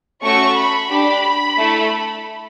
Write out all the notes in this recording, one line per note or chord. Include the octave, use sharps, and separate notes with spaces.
A3 C#4 F#4 A4 C#6
B5
D4 G4 B5
A3 E4 A4